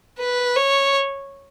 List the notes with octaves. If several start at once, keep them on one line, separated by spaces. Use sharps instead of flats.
B4
C#5